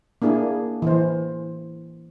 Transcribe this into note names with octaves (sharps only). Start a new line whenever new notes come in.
A#3 D4 E4 G#4
E3 C5